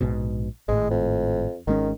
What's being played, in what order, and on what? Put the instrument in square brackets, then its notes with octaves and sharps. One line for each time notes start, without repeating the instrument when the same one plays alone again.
[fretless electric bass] A#1 G#2 B2
[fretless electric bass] G#1 A2 [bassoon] G#3
[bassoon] F2
[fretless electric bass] G#1 G#3 C#4 [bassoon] D#3